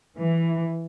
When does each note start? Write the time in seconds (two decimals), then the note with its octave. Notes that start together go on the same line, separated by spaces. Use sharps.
0.18 E3